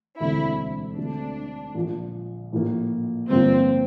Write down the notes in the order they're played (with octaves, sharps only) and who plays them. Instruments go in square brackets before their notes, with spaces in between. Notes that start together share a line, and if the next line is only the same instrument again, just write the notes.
[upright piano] E1 D2 D3 A3 C4 [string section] E4
[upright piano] D2 D3 A3 C4 [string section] D4
[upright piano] A#1 A#2 F3
A#1 A2 F3 A#3
[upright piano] G1 G2 F3 A#3 F4 [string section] C4